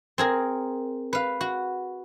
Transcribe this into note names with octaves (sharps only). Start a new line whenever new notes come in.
C4 G#4 A#4
B4 F5
F#4